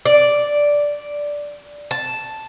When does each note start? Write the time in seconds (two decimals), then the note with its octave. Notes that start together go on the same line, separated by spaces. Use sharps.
0.05 D5
1.91 A5